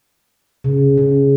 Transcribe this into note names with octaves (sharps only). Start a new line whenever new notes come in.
C#3
C#3